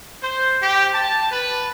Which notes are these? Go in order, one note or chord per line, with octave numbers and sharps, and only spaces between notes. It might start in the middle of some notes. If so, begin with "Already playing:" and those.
C5
G4
A5
B4